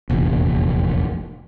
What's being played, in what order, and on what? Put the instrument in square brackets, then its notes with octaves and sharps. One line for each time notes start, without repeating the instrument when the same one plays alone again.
[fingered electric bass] F1 A#1 E2